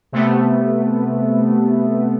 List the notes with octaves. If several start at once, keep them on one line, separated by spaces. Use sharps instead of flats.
C3 A3 B3